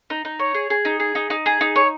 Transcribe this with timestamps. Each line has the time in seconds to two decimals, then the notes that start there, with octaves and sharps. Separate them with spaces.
0.10 D#4
0.25 D#4
0.39 C#5
0.55 G#4
0.70 G#4
0.85 D#4
1.00 G#4
1.15 D#4
1.30 D#4
1.46 G#4
1.61 D#4
1.76 C#5